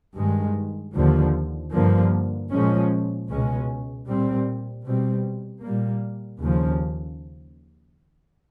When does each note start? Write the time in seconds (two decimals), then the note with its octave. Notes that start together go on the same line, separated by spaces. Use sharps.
0.16 G2 D#3 G#3
0.94 D#2 D3 F3
1.72 G2 D3 F3 A#3
2.50 A#2 F3 G#3 C#4
3.28 C#2 B2 G#3 C#4
4.06 A#2 G3 C4
4.84 B2 G3 C4
5.61 A#2 G3 A#3
6.40 D#2 C#3 F3